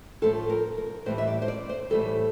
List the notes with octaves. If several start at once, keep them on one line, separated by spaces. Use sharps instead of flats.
A2 F3 A3 A4
A#4
A#4
A2 E3 G3 C5
E5
D5
C5
D5
C5
A2 E3 G3 A4